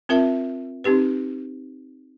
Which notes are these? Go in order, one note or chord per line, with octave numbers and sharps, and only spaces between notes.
C4 F4 A#4 E5 A5
C4 D#4 G4 B4